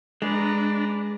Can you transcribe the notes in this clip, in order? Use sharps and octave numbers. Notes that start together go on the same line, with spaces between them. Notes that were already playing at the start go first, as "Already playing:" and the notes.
G#3 D4 B4 A#5